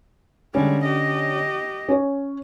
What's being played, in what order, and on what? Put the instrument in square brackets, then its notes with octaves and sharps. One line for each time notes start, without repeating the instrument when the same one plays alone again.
[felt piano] D3 C#4 [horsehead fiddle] G3 G#3
[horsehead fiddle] G4 D#5
[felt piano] C#4 C#5